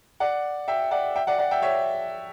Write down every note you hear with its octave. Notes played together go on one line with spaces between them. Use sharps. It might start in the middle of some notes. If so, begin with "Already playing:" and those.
D5 F#5
E5 G5
D5 F#5
E5 G5
D5 F#5
D5 F#5
E5 G5
C#5 E5